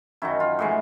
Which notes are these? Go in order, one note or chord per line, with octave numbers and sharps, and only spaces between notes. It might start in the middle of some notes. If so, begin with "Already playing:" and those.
F#2 D#3 F#3 E4
F4
A2 E3 G#3